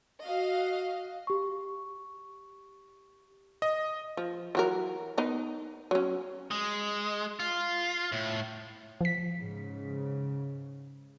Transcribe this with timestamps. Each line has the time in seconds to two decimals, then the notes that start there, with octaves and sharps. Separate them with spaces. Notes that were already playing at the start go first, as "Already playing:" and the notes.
0.25 F#4 D#5 F5
1.27 G4 C#6
3.62 D#5
4.17 F3
4.55 E3 F#3 A#4
5.18 B3 D#4 A#4
5.91 F#3 C#4
6.51 G#3
7.40 F4
8.12 A2
9.01 F3 B6
9.35 G#2 C#3